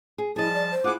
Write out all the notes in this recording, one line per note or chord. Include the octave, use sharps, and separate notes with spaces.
G#4
F3 G3 E4 G#4 D#5 A5
D5
C5
E4 F4 G#4 F#5 D6